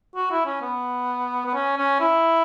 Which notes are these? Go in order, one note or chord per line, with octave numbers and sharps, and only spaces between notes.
F#4
E4
C#4
B3
B3
C#4
C#4
E4